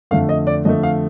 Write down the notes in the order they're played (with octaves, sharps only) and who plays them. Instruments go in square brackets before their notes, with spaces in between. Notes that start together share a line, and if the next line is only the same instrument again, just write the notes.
[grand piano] F2 D3 A3 F5
D#5
D5
F2 D3 A3 D#5
F5